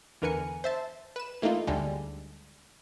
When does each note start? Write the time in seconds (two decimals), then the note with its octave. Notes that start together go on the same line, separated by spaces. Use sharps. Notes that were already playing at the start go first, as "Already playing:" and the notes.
0.22 E2 D3 A#4 B4 G#5 C#7
0.64 C5 E5 A5
1.16 B4 E7
1.42 E3 A3 A#3 D#4 F4
1.67 D2 D3 G3 G#3